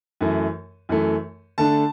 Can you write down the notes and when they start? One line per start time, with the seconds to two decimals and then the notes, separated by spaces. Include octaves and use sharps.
0.21 F#2 E3 A3
0.89 F#2 E3 A3
1.58 D3 A3 D4 A5